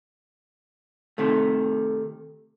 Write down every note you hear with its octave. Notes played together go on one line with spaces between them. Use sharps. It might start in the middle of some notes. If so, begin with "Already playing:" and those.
C3 D#3 A3